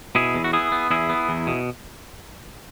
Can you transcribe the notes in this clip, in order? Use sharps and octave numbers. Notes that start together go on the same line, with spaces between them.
B2 E4 G#4
E2
F#4
B3 E4 G#4
B3
E2 E4 G#4
B3
E2
B2